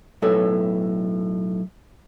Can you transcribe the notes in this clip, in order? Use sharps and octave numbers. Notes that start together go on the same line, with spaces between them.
B1 A2 A4 B4 C#5